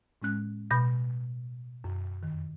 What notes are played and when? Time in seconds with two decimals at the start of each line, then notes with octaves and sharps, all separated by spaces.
0.22 A2 G#3 C#4 F#6
0.71 B2 B5 G6 A#6
1.84 F#2
2.23 F2 D#3